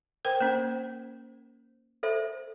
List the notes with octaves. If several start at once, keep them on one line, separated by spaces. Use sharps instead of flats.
A#4 C5 G5
A#3 C#4 C5
A4 C5 E5